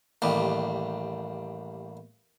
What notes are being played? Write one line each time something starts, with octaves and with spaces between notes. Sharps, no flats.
A1 D#2 G3